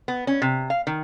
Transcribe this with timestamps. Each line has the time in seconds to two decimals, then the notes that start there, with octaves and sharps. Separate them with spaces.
0.08 B3
0.27 C#4
0.42 C3
0.70 F5
0.87 D#3